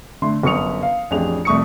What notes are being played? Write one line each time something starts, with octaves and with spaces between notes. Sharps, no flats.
D3 A3 C6
G1 F#2 C#6 D#6 C#7 F7
F5
A1 F2 D4 G4 G#4 F7
C2 F2 A3 C#6 D#6 C#7